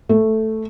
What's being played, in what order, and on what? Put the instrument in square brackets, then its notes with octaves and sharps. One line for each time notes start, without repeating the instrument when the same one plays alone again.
[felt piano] A3